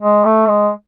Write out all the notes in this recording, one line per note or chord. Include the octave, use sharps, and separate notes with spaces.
G#3
A3
G#3